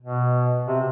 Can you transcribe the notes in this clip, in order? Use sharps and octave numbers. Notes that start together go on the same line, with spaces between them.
B2
C3